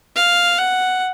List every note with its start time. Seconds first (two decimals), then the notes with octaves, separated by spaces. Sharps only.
0.16 F5
0.59 F#5